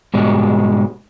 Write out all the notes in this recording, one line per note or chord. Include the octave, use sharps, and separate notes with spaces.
G#2 B2 G3 G#3